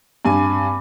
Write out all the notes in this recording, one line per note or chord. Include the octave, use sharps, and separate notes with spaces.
G2 C4 G#5 B5 D6